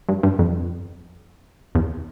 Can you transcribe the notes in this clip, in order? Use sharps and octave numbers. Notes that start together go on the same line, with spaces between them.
G2
G2
F2
E2